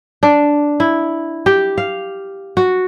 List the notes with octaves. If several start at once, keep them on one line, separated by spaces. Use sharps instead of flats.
D4
E4
G4
F5
F#4